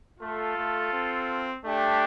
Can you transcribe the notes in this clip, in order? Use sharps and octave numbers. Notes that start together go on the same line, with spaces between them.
A3 F4 A4
A3
C4
A3 D4 G4